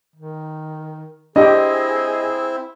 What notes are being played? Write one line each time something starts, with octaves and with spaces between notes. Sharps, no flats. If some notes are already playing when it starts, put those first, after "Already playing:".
D#3
C4 D4 E4 G4 G#4 D#5